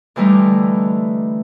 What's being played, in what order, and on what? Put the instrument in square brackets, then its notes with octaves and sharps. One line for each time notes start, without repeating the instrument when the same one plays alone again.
[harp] D3 E3 G3 A3 D#4